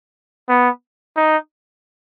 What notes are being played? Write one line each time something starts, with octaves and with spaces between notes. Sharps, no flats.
B3
D#4